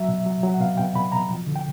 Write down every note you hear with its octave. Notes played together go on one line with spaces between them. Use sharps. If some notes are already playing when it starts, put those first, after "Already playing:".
Already playing: F#3 E5
B2
F#3
F#3
F#5
B2 F5
B2 G5
B2 B5
B2 A#5
F3
D3
G5